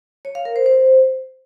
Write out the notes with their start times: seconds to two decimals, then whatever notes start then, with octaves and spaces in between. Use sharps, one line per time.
0.25 C#5
0.35 F5
0.45 A#4
0.56 C5
0.66 C5